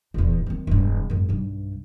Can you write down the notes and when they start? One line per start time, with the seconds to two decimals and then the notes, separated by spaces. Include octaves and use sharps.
0.14 D#1 E2
0.46 D#3 C4
0.67 E1 G2
1.10 G#1 F#2
1.29 B1 G2